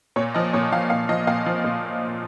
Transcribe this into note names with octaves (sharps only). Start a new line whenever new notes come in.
A#2 C#5
F3 D#5
A#2 C#5
F3 F5
A#2 F5
F3 D#5
A#2 F5
F3
A#2